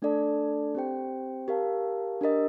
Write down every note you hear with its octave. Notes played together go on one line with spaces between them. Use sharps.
A3 D4 A4 D5 A5
C4 G4 C5 G5
G4 A#4 F5 A5
D4 G4 A#4 D#5